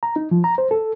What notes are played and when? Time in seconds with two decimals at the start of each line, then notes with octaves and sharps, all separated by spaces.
0.03 A#5
0.16 D#4
0.31 F3
0.44 A#5
0.58 C5
0.71 A4